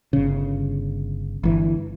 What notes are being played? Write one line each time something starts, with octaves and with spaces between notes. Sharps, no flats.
G1 C#3
G1 E3